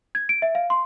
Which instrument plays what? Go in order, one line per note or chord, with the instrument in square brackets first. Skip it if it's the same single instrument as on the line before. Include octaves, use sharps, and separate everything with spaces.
[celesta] G#6
D7
E5
F5
C6